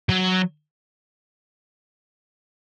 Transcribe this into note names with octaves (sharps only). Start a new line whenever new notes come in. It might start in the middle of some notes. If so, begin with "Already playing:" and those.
F#3